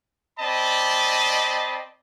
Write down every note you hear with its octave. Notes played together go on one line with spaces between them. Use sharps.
C4 D5 D#5 A5 B5